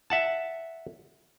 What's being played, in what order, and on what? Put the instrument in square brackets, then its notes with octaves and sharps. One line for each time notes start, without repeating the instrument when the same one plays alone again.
[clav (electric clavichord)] E5 F#5 A5